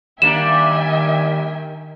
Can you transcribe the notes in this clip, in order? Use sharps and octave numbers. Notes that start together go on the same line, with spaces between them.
D#3 G3 A#3 D4 E5 G5 G#5 E7